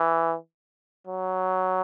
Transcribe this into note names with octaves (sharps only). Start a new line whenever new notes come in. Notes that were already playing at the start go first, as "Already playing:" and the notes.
Already playing: E3
F#3